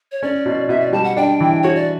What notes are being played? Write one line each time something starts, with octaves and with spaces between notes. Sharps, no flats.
C#5
C#4 D5
B2
B2 E5
D5
G3 A5
F#5
D4 G5
E3
F#4 C#5
D5